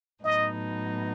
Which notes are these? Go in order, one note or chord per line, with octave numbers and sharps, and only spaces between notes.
A2 F#3 B3 D#4 D#5